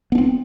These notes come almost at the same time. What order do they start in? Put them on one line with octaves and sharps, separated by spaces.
B3 D4 C4